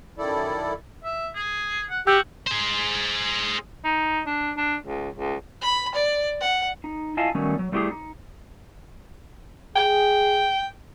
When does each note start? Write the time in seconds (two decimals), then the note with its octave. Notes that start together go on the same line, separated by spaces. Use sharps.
0.18 F#2 D#3 E4 A4 D5
1.04 E5
1.35 G#4
1.89 F#5
2.07 F#4 G4 G5 E6 G6
2.47 G#4 C5
3.84 D#4
4.26 D4
4.57 D4
4.86 C#2
5.16 C#2
5.62 B5
5.95 D5
6.41 F#5
6.84 D#4
7.17 E4 F4 D#5 F5 G#5 A5
7.35 D#3 F#3 G3 A3 B3 C#4
7.59 F#3
7.72 G3 A3 E4 F4 G4 G#4
7.91 D#4
9.76 G#4 G5